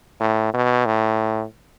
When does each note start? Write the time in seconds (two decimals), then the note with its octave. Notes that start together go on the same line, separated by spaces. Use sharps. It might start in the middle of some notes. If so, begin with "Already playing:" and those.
0.20 A2
0.54 B2
0.86 A2